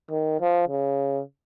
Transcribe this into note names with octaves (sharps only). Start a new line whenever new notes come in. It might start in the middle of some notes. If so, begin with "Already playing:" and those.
D#3
F3
C#3